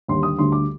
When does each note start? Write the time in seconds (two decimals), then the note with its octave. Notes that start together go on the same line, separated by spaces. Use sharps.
0.08 D#2 D3 G3 C6
0.23 D#6
0.38 D2 D3 G3 C6
0.52 D6